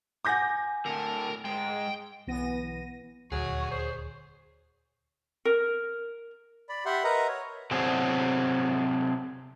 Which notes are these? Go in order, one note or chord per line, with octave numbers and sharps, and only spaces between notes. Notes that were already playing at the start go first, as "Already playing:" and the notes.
F#5 G#5 D6 D#6 G6 A#6
A2 D3 A#4
G#2 G#3 G5
B1 E3 B3 A#6 D#7
D#1 D2 F#3 G#4 C#5
C5
A#4
D5 B5
G4 E5 F#5 B5 C6
A#4 B4 D#5 E5 F#5 A#5
C#5
C3 F#3 C4 D4 G#4